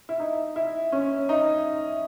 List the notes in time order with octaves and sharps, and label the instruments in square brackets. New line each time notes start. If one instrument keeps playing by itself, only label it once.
[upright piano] E4
D#4
E4
C#4
D#4